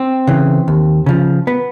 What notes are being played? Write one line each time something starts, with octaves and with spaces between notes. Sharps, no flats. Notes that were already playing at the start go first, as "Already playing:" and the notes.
Already playing: C4
C#3 E3
D#2
C#3 F3
B3